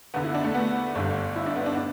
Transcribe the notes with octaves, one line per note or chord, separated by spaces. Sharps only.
E2 D3 B3
E4
D4
A3
B3
G1 G2 D3
E4
D4
B3
D4
D4